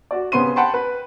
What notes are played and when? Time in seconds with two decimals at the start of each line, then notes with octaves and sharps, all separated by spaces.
0.11 F#4 D5
0.32 C#3 B3 C4 C6 D#7
0.56 F#5 G5 A5 B5 C6
0.74 B4